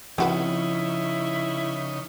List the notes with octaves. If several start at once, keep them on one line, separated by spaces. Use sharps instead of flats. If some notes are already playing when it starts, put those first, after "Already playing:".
C#3 F3 C4 D#4 E4 F#4 B4